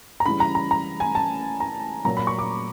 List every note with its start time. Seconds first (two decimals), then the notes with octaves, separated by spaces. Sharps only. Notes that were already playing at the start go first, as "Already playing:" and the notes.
0.20 A#5
0.26 C#3 E3 G3 B5
0.40 A#5
0.55 A#5
0.71 A#5
1.00 G#5
1.15 A5
1.60 A#5
2.05 A#2 F#3 A#5
2.17 B5
2.27 C#6
2.39 D6